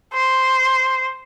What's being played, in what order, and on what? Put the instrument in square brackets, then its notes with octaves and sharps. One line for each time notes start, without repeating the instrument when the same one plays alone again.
[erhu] C5